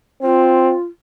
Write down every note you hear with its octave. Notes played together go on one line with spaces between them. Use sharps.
C4 F4